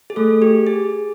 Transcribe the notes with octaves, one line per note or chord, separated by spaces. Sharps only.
G#4
A3 A4
G4
G#4